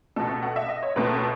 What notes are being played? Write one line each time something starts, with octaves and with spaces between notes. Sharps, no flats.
C#2 B2 A3 A4
F#5
E5
D#5
C#5
C#2 B2 A3 B4